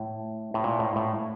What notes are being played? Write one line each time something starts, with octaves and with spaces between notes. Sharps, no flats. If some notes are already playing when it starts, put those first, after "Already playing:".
Already playing: A2
A2
A#2
A2
A2